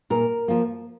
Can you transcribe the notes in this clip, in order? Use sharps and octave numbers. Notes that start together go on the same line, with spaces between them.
A#2 A#4
F3 A#3